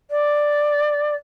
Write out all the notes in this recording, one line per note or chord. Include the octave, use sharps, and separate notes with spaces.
D5